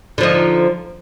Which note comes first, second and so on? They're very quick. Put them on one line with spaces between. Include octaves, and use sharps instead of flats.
D3 F3 D#4